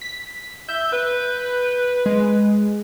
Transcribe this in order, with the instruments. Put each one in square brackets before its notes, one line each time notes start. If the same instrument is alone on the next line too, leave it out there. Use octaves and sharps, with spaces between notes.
[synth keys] B6
[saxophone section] E5 [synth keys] G6
[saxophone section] B4
[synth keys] G#3